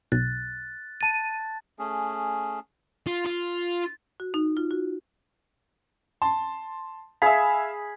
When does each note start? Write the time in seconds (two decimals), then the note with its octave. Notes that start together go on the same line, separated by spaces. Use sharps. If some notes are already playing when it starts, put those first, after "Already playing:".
0.12 B1 F#6 A6
1.01 A5 A6 D#7
1.79 A3 C#4 G#4
3.07 F4
3.26 F4
4.20 F#4
4.34 D#4
4.57 F4
4.71 F#4
6.22 A5 C6
7.22 G#4 E5 F5 B5